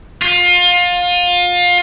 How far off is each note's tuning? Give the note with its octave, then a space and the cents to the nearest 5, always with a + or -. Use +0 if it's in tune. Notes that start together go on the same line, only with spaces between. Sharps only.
F4 +25